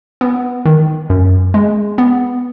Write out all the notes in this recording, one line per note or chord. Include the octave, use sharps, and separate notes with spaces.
B3
D#3
F#2
G#3
B3